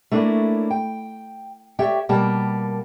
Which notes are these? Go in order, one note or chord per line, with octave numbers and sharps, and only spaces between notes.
A3 A#3 D4 E4 C#5
G5
G4 C#5 D5 E5 G5
B2 G3 A#3 A#4 G5 A5